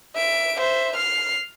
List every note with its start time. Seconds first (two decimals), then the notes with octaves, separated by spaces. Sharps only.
0.15 E5 D7
0.59 C5 E5
0.96 F6 C7